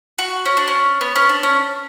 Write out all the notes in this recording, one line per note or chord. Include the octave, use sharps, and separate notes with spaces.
F#4
C#4
D4
C#4
B3
C#4
D4
C#4